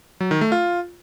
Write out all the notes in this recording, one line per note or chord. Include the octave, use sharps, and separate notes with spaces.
F#3
D#3
A3
F4